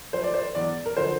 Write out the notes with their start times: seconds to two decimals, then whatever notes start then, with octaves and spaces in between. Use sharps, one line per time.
0.13 F3 C5
0.24 D5
0.34 C5
0.55 E2 D5
0.86 A#4
0.97 D3 F3 C5